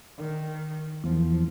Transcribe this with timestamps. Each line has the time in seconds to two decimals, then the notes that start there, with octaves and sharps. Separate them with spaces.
0.17 D#3
1.04 E2 F3